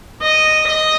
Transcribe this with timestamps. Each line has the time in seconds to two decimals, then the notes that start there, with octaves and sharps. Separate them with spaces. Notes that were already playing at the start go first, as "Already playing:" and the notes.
0.22 D#5
0.67 D#5